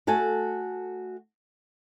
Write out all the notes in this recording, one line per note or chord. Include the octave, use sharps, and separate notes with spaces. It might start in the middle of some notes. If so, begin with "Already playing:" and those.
A3 F#4 A4 G#5 A5